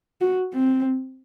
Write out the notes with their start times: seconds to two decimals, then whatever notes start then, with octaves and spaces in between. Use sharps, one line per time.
0.21 F#4
0.54 C4